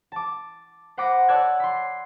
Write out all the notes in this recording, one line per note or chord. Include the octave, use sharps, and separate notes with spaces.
A5 D6
C5 F#5 B5 D6 D#6 A#6
C#5 D5 A5 E6 F#6 G#6
B5 C6